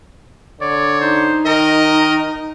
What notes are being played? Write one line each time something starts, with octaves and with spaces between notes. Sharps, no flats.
D3 C#5 D5
D#4 C5
D#3 A#4 D#5